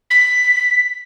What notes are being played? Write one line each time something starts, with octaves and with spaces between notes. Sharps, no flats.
B6